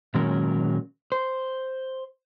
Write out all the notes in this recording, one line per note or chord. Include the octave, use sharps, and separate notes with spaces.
A#2 D#3 F#3 G#3 C#4 A#4
C5